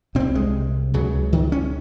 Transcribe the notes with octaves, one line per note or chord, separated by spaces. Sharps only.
C3 C4
C2
G#3
C#2 C#3 F#3
D#3
C#4